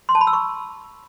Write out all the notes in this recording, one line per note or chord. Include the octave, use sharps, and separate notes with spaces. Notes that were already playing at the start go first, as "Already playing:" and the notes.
C6
A5
B5
E6
C#6